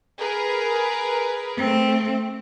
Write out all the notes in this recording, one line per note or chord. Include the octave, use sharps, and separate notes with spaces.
G#4 A#4 B4
A3 C4